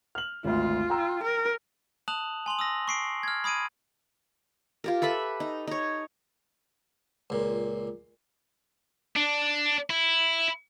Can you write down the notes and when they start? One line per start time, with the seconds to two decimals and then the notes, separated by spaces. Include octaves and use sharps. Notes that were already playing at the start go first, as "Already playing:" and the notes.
0.15 F6 F#7
0.45 G#1 D2 F4
0.90 G5 A#5 E6
1.23 A#4
2.08 A5 D#6 F#6 F7 F#7
2.46 G#5 C6 F7 F#7
2.59 D#6 E6 A#6
2.88 C#6 C7 D7
3.23 F6 G#6
3.44 B5 D#6 G#6 D7 D#7
4.84 F4 G4 A#4
5.02 A4 B4 E5 B5
5.40 D#4
5.68 D#4 C#5
7.30 C#2 A#2
9.16 D4
9.90 E4